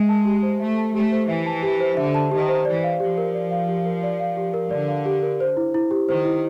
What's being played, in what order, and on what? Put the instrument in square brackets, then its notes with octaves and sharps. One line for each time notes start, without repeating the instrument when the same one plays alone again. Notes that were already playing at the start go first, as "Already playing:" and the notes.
Already playing: [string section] G#3 [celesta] E5
[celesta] A5
G4
C5
[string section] A3 [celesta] E5
[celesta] A5
[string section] A3 [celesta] G4
[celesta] C5
[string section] E3 [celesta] E5
[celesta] A5
G4
C5
[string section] D3 [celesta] E5
[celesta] A5
[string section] D#3 [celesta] G4
[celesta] C5
[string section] E3 [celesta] D5
[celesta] F5
[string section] F3 [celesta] G4
[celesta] A#4
D5
F5
G4
A#4
D5
F5
G4
A#4
[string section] D3 [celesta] D5
[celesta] F5
G4
A#4
C5
E4
E4
G4
[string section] D#3 [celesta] C5
[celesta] E4